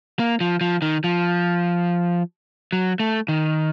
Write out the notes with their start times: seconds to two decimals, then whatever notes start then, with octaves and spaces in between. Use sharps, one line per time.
0.19 A#3
0.41 F3
0.61 F3
0.82 D#3
1.04 F3
2.73 F#3
3.00 A3
3.28 D#3